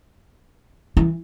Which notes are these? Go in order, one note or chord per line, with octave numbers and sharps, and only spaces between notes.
E3